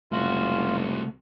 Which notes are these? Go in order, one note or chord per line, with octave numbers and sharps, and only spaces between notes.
F#1 C2 A3 F4 F#4